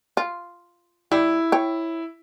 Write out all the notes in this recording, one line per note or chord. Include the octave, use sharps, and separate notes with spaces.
F4
G3 E4
C#5 G5